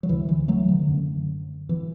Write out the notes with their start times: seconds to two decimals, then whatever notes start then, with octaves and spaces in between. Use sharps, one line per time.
0.03 F#3
0.08 D2 D3 E3
0.29 E3
0.48 F#3 A3
0.69 D3
0.88 F#2 D3
1.69 B2 E3